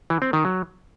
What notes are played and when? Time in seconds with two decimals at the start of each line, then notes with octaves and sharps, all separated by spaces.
0.10 E3
0.22 C4
0.33 D#3
0.45 F#3